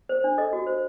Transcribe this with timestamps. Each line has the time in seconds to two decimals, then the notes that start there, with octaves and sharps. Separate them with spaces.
0.09 C5
0.24 D4
0.38 A4 D#5
0.53 F#4
0.67 C5